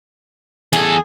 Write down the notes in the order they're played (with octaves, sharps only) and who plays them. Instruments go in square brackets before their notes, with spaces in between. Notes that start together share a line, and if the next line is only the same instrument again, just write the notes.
[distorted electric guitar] E2 A4 [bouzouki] G#4